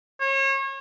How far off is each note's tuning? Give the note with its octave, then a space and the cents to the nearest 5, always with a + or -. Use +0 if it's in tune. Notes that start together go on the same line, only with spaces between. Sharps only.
C#5 -35